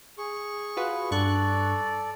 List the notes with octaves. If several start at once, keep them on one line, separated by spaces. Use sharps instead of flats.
G#4 C#6
F4 F#4 B4
G2 A4 D5 C#6 F#6